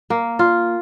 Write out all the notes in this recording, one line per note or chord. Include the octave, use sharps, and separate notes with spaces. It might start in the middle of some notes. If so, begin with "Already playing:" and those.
A#3
F4